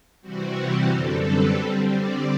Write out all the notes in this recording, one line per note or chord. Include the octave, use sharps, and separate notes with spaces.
C3 E3 G3 C4 F#4
G4
F#2 D3 G3 C4 A4
B4
D3 G3 C4
D5